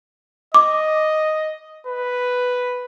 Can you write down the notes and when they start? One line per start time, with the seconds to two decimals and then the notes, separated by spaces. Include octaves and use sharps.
0.54 D#5 D6
1.87 B4